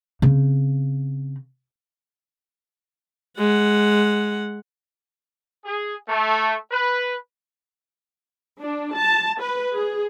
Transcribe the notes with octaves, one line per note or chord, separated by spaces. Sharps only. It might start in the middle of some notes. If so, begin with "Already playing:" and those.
C#3 C4
G#3 F#5
G#4
A3
B4
D4
A5
B4
G#4